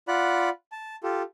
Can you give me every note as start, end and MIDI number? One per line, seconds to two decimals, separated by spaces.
0.08 0.49 65
0.08 0.49 74
0.08 0.49 78
0.08 0.49 83
0.08 0.49 90
0.72 0.96 81
1.03 1.23 65
1.03 1.23 67
1.03 1.23 69